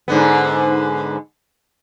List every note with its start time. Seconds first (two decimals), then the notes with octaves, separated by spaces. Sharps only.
0.08 G#2 D3 B3